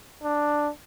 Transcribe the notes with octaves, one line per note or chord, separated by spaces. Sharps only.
D4